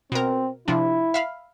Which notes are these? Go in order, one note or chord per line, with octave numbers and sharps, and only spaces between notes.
B2 C4 A#4
C3 F3 D4 E4
E5 F5 B5